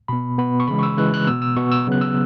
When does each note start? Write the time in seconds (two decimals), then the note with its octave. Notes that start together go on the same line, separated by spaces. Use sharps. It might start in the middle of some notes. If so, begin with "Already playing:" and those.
0.08 B2 B3 B5
0.38 B2 B3 B5
0.60 C#6
0.67 C#3 E3 G#3 B5
0.79 C#6
0.83 E6
0.98 C#3 E3 G#3 F#6
1.14 F#6
1.27 B2 B3 E6
1.42 E6
1.56 B2 B3 C#6
1.72 E6
1.87 C#3 F#3 B3 F#6
2.01 E6